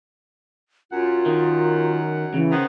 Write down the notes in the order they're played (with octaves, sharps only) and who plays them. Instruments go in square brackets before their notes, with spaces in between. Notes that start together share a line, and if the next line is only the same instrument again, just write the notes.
[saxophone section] F#2 F#5 [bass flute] F4
[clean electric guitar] D#3
[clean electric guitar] C#3 [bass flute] E3
[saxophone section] D#3 B3 C5